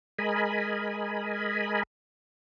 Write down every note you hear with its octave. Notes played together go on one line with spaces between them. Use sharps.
G#3 A#4 D#5 G#5 B5